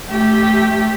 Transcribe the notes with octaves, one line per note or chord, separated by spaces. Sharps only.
A3 G4